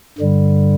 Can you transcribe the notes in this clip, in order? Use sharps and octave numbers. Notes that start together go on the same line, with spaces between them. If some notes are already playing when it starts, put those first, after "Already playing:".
G2 D3 G3